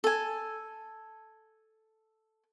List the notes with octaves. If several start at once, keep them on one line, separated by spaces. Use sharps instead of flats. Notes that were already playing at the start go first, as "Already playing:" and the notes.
A4 G#5